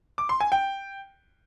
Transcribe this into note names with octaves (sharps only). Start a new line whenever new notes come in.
D6
C6
G#5
G5